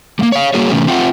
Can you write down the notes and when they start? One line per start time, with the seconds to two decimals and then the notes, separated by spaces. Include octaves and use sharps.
0.19 G3 A#3
0.32 C#5 F5
0.54 G3 A#3 F#4 G#4 C#5
0.71 C3 E3 A3 C#4
0.87 C4 F4 E5 F#5 G5